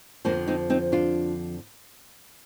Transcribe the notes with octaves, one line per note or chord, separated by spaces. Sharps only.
F2 D3 F3 A#3 D4
C4 D#4
C4 D#4
D4 F4